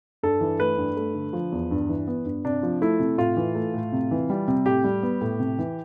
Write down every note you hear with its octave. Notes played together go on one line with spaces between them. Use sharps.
G2 A4
E3
A3 B4
G2
A3
D3
F3
E2
G2
E3
B3
G2
C3 D4
F3
A3 E4
C3
A2 F4
E3
A3
A2
C3
E3
G3
C3
A2 G4
G3
B3
A2
C3
E3